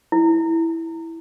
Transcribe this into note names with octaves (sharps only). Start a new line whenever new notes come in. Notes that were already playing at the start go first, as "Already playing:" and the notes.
E4